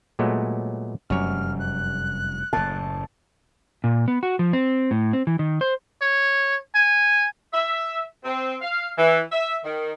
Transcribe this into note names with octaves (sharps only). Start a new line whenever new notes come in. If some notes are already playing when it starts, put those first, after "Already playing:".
A#2 F#3 G#3 A3 B3
F1 F#2 G3 C#5 F6
F#6
F#1 A2 A5
A#2
B3
F#4
F3
C4
A2
C4
E3
D#3
C5
C#5
G#5
E5
C4
F5
E3
E5
D#3